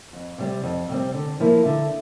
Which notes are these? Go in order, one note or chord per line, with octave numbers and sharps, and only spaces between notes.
F2
C3 G3 C4
F2
C3 G3 C4
D3
F3 A#3 E4
D3